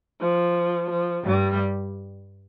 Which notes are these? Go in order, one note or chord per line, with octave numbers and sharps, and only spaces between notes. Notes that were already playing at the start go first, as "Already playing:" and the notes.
F3
F3
G2 G3